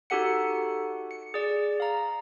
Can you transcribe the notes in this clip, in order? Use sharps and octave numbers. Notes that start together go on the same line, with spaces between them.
D#4 F#4 G4 A4 F#5 C#7
C#7
G#4 D5
F5 A#5